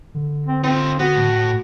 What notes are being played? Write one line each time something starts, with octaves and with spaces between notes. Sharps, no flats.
D3
C4
C4 D#4 F4
B3 F#4
A2